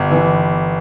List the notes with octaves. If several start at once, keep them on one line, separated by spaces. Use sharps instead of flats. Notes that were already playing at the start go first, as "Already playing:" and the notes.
Already playing: G1
E3